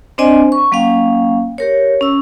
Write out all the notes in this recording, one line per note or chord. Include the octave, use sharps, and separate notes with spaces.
C4 D4 C5 D5 D#5 G#5
C#6
F#3 A#3 C#4 F5 G5
G4 A#4 C#5
C#4 E6